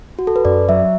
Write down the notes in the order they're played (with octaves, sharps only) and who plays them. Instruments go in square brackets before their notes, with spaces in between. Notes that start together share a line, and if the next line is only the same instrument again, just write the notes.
[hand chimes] F#4
A4
B4
[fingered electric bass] F#2 [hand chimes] D5
[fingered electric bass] F#3 [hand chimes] E5